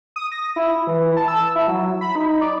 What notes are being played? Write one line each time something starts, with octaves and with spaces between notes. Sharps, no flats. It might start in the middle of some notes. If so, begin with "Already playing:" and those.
D#6
A#6
E4
E3
A5
E6
E4
F#3
B5
D#4
D5